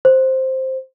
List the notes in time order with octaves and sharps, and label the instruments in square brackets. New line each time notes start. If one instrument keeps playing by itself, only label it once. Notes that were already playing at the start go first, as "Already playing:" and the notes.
[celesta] C5